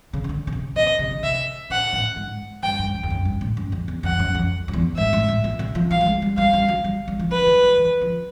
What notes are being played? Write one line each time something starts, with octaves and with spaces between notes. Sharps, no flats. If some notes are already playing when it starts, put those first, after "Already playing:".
C#3
C#3
D3
C#3
C3
B2 D#5
C3
C#3
C3 E5
A#2 F#5
A2
G#2
G2 G5
G2
F#2
F2
F#2
G2
A2
F#2
F2
E2
F2 F#5
F#2
F2
F2
E2
G#2 E5
G#2
A2
A#2
C3
F3
F3 F5
G3
G#3
G3
G3 F5
G3
F#3
G3
G3
F3
F3 B4
F#3
F#3
E3
F3